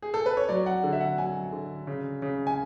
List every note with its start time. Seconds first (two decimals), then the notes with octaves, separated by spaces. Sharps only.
0.02 G#4
0.14 A4
0.26 B4
0.37 C#5
0.49 F#3 D5
0.66 F#5
0.84 D3
0.93 E5
1.01 F#5
1.18 F#3 G#5
1.53 D3
1.87 C#3
2.22 C#3
2.47 G#5